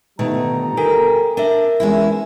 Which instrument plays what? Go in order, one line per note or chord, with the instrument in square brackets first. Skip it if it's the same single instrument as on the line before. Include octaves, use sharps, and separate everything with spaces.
[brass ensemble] G1 G3 A#5 [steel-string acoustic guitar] B2 D#3 A3
[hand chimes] A4 A#4 G#5 [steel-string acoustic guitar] G5
[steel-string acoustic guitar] D4 [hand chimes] A#4 E5
[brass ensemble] E2 [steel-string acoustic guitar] G#3 C#4 E4